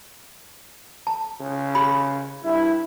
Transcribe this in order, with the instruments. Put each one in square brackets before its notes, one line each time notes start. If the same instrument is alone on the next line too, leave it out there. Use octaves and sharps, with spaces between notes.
[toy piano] A5
[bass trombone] C#3
[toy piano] G4 B5
[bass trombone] G2 [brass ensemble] E4